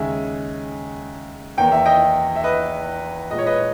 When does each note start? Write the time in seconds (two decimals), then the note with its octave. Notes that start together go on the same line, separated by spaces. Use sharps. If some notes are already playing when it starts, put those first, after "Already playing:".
Already playing: D#2 C#3 G#3 E5 G#5
1.57 E2 D#3 A#3 G5
1.72 E5
1.86 D#5 G5
2.36 E5
2.44 B4 D#5
3.31 A#2 G#3 D#5
3.38 C#5
3.46 B4 D#5